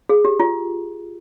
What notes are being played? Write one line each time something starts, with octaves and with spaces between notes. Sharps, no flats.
G#4
G4
F4